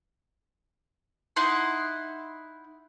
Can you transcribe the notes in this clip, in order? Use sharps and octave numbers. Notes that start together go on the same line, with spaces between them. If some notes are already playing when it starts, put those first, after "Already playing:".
D#4 E4 F#5 C6